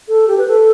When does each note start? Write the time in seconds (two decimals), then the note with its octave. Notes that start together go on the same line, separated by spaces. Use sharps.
0.08 A4
0.28 G4
0.38 B4
0.48 A4